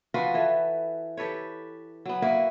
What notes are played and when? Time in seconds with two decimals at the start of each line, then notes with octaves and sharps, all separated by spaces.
0.14 F3 F4 F#4 B4
0.34 E3 A4
1.17 G4 A4 B4 C#5
2.05 F#3 B3
2.22 A#3 E4 F#4 B4